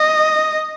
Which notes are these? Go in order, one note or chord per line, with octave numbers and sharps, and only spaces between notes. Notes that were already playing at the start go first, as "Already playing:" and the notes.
Already playing: D#5